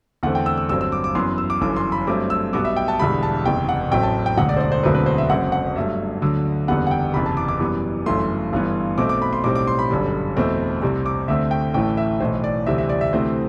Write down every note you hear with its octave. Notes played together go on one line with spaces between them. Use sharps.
E2 D3 A3 C4 F#5
G5
E6
E6
G1 G2 F#3 C4 E6
E6
D6
D6
F#2 E3 B3 C6
E6
D6
G1 F#2 E3 D6
C6
B5
G2 F#3 A3 C4 D6
E6
B1 B2 G3 B3 D6
E5
G5
A5
E1 E2 D3 G3 B5
A5
F#1 E2 C3 G5
F#5
A1 A2 F#3 A3 C4 G5
A5
G5
E1 D2 D3 F#5
D5
C5
D5
C5
E1 D2 D3 F#3 C4 B4
B4
C5
E5
F#1 F#2 F#3 C4 F#5
F#5
G2 F#3 A3 E5
D2 D3 F#3
F#1 E2 D3 G3 B3 F#5
F#5
G5
F#1 E2 C3 B5
A5
D6
D6
F#2 E3 G3 B3
G1 F#2 E3 A3 C6
G1 G2 E3 B3
B1 B2 A3 C4 D6
D6
B5
C6
B1 A2 G3 C4 D6
D6
C6
B5
G1 F#2 D3 G3
E2 B2 A3 C4
C2 C3 G3 C4
D6
D2 D3 A3 C4 E5
G5
A1 A2 E3 A3 G5
E5
B1 A2 E3 C5
D5
D2 C3 E3 G3 C4 E5
E5
D5
E5
D2 C3 E3 A3 C4 C5